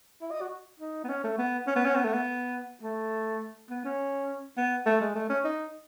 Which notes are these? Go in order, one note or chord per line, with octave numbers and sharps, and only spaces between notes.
E4
D#5
F#4
D#4
B3
C#4
A3
B3
C#4
B3
C#4
B3
A3
B3
A3
B3
C#4
B3
A3
G#3
A3
C#4
D#4